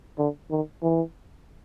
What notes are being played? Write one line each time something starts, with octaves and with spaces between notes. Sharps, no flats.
D3
D#3
E3